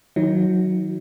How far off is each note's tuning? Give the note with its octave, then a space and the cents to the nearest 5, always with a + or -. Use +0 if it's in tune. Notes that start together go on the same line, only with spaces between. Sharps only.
D#3 +15 F#3 +0 D#4 +35